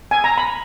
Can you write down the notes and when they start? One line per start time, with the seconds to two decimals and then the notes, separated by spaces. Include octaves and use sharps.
0.11 G#5
0.24 A#5
0.38 B5